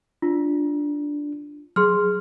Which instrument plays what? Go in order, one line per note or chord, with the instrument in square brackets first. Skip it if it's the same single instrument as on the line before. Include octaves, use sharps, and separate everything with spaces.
[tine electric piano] D4 [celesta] F4
[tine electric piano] F#3 [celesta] G#4 C6 F6